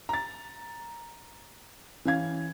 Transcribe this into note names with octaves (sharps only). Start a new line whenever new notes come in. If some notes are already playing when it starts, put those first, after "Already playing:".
A#5 A6
E3 C#4 F5 G#6